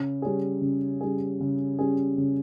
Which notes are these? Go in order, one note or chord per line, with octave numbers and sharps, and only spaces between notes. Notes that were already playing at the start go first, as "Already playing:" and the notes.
Already playing: C#3
G3 C#4 G#4
C#3
G3 C#4 G#4
C#3
G3 C#4 G#4
C#3